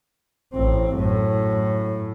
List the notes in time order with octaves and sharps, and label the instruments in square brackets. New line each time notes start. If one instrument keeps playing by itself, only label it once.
[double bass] A1 C4
F#2 A2